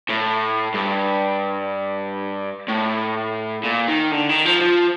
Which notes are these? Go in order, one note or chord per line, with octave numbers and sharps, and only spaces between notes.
A2
G2
A2
A#2
D#3
D3
D#3
F3
F3